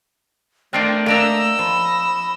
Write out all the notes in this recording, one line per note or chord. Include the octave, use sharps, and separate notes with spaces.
A3 C4 D4 F4 A#4 F5 G5
A#3 D4 D#5 E5 G5 A#5 E6
F3 B5